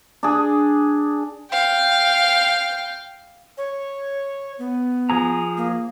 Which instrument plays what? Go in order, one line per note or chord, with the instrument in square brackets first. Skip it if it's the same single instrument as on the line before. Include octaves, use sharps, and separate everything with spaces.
[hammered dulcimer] D4 G#4
[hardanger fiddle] F5 G5
[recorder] C#5
B3
[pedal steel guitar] F3 G#4 A#5
[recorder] A#3